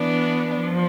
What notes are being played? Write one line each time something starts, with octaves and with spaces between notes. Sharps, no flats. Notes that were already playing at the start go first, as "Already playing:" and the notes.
Already playing: E3 B3 D4
F3